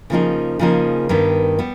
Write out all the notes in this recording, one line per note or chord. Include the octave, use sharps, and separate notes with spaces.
C#3 F3 A#3 D#4 G#4
C#3 F3 A#3 D#4 G#4
G2 D#3 G3 B3
G3 B3